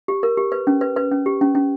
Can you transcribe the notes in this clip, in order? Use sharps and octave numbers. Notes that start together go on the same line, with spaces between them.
G4
A#4
G4
B4
C#4
B4
B4
C#4
G4
C#4
C#4